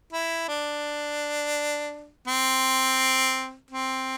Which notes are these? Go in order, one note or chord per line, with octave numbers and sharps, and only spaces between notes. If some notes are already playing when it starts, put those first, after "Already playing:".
E4
D4
C4
C4